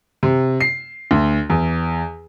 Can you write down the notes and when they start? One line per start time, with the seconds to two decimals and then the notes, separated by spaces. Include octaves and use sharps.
0.23 C3
0.61 C7
1.11 D2
1.50 E2